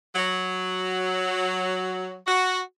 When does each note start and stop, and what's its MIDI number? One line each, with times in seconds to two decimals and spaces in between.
0.16 2.15 54
2.27 2.59 66